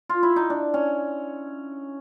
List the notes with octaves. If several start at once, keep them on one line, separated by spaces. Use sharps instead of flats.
F4
E4
D#4
D4
C#4